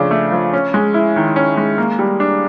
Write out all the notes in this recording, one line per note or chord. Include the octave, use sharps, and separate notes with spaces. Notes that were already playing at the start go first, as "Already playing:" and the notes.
Already playing: C#3 F3 A3 D4
A3
F3
C#4
G#3
E4
D#3
C#4
G#3
A#3
G3
D4